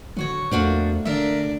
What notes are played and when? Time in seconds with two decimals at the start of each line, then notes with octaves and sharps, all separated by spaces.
0.17 D3 F#3 F#4 C#5
0.51 E2 F3 A3 A#3 D4 F#4
1.05 D3 D4 A#4 E5